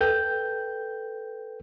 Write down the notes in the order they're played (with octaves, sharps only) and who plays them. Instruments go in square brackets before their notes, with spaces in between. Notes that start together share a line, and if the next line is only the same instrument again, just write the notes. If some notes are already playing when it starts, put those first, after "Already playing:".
[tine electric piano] A4 B4 G5 G6